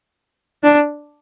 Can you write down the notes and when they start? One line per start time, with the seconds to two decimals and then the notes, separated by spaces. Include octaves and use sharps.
0.63 D4